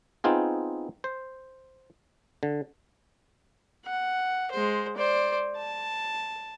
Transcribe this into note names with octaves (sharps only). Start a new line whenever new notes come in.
B3 C4 D#4 F4 G#4
C5
D3
F#5
G#3 C5
C5 D5
A5